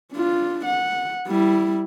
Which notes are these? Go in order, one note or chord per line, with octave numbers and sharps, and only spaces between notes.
D4 F4
F#5
G3 E4